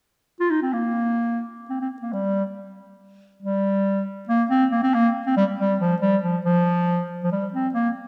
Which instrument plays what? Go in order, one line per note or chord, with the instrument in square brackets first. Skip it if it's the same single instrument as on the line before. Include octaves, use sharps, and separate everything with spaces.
[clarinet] F4
D#4
C4
A#3
C4
C4
A#3
G3
G3
A#3
C4
A#3
C4
A#3
C4
G3
G3
F3
G3
F3
F3
F3
G3
C4
A#3